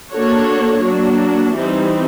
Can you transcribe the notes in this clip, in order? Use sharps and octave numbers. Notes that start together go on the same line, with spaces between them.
A#3 D4 F#4 A4 C#5
F#3 A#3 D4 F#4
E3 G3 C4 D#4